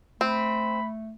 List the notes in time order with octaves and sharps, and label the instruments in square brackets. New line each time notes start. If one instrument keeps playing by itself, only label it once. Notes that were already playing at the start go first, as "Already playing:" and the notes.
[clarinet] A3 [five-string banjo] C4 [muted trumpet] B5